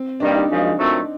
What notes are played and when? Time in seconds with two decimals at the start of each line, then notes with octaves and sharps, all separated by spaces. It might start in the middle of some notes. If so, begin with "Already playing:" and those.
Already playing: C4
0.20 G2 D#3 G3 A#3 D4
0.35 D#4
0.49 F#2 C#3 F3 G#3
0.77 A#2 F#3 A3 C4